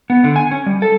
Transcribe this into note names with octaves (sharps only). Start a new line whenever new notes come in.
B3
D3
G#5
C#4
G3
A4